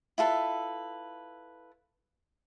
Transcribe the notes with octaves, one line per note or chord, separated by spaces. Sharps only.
E4 F4 A4 B4